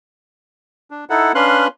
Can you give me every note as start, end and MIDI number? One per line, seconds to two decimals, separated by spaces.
0.91 1.05 62
1.10 1.32 63
1.10 1.32 64
1.10 1.32 69
1.10 1.32 78
1.35 1.68 61
1.35 1.68 62
1.35 1.68 71
1.35 1.68 77
1.35 1.68 84
1.35 1.68 90